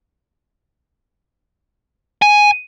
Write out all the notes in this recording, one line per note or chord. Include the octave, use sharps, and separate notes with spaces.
G#5